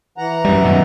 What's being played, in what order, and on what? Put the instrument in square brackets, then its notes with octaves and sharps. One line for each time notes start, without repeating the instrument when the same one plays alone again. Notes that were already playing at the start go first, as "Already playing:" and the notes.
[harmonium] E3 F#5 A#5
[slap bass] F#2 G3
F#2 B2 D#3